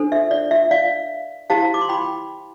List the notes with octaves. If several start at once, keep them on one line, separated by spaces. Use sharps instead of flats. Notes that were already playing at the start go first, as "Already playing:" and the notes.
Already playing: D4 A4 C5
E5
D5
E5
D5 F5
E4 G4 C5 F5 A5
D6
C6
G5 B5